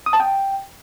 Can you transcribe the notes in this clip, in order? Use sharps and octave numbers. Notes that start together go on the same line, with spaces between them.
D#6
A5
G5